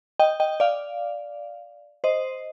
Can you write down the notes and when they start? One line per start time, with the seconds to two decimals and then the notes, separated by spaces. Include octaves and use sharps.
0.20 D#5 G5
0.40 D#5 G5
0.60 D5 F5
2.04 C5 D#5